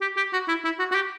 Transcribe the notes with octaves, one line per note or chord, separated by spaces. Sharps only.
G4
G4
F#4
E4
E4
F#4
F#4
G4